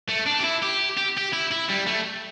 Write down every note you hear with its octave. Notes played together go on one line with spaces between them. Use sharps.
A3
D4
G4
E4
G4
G4
G4
E4
E4
G3
A3